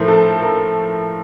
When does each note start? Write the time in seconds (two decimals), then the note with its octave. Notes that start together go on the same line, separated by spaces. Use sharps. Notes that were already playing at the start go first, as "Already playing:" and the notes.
Already playing: A2 F3 A3 A#4 C5
0.08 A4
0.42 A#4